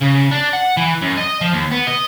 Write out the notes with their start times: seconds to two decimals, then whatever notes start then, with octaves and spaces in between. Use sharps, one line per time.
0.01 C#3
0.31 D4
0.53 F#5
0.77 E3
1.02 F#2
1.17 D#5
1.41 F3
1.53 D#2
1.72 B3
1.88 D#5